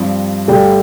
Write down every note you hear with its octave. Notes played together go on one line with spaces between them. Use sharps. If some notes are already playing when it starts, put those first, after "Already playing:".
Already playing: G2 F3 C4
G2 D3 A3 D4 G4 G5